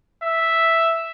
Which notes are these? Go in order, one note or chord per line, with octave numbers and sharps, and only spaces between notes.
E5